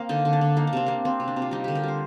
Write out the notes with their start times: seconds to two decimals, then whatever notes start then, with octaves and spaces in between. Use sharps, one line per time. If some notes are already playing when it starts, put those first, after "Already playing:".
Already playing: A#3 C4
0.09 D3 D#4
0.25 D3
0.33 D4
0.41 D3
0.57 A#3 D#4
0.67 D4
0.73 C3 C4
0.87 A#3 D4
1.05 A#3 C4
1.20 C3
1.28 D4
1.36 C3
1.42 F4
1.51 G3 D#4
1.64 D3 G4
1.75 A#4
1.83 G3 C5